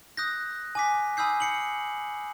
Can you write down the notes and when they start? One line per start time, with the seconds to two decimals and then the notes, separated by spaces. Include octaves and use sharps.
0.17 D#6 F#6 G6 A#6
0.75 G#5 D6 B6
1.17 G#5 B5 D#6 E6 G6 C7
1.40 C7 C#7 F#7